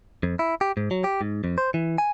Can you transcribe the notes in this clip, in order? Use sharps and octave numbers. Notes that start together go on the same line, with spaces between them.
F2
E4
G4
G#2
F#3
G4
G#2
F2
C5
E3
G#5